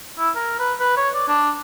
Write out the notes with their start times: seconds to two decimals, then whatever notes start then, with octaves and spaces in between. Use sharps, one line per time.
0.19 E4
0.36 A#4
0.60 B4
0.80 B4
0.97 C#5
1.15 D5
1.29 D4